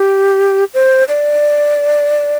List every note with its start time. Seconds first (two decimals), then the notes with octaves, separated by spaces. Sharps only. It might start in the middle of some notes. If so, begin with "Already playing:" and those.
Already playing: G4
0.74 C5
1.08 D5